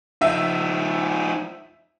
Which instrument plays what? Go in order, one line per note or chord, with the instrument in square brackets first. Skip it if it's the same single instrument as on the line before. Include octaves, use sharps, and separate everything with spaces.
[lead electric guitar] F3 D#4 [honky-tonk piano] E5